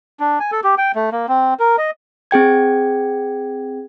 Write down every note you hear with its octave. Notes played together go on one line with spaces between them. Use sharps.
D4
G#5
A4
G4
G5
A3
A#3
C4
A#4
D#5
C4 G#4 G5 G#6